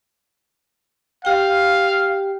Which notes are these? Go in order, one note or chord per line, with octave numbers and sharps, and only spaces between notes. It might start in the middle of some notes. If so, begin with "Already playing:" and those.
G4 F5 G5